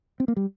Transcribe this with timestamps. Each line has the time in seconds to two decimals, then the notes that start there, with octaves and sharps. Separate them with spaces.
0.20 C4
0.28 A#3
0.37 G3